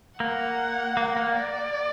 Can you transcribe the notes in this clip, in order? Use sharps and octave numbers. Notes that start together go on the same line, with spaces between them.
A#3 F#5
A#3
A#3
D5